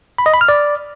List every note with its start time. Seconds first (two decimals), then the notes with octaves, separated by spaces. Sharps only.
0.18 B5
0.26 D#5
0.33 B5
0.41 F6
0.49 D5